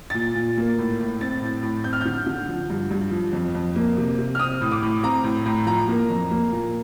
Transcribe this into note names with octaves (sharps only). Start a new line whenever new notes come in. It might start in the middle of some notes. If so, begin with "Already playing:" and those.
A#2 A6
A#2
A#3
A2
A2
C4 A6
A2
A2
C4 G6
F6
D3 G6
D3
F3
G2
G2
F3
F2
F2
A#3
C3
C3
F6
C4 D#6
A2
D6
A2
C4 A#5
A2
A2
F3 A#5
A#3
F2
A#3
A#2